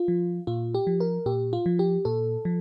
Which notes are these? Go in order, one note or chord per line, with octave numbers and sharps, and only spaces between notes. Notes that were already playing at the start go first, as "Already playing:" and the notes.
Already playing: F4
F3
A#2 F4
G4
F3
A#4
A#2 G4
F4
F3
G4
A#2 A4
F3